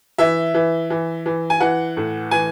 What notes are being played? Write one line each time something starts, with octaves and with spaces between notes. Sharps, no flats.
E3 E5
E3
E3
E3
G#5
E3 F#5
A2
E3 G#5